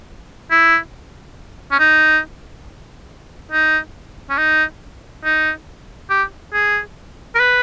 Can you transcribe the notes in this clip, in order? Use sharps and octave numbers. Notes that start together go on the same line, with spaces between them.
E4
C#4
D#4
D#4
C#4
D#4
D#4
G4
G#4
A#4
B4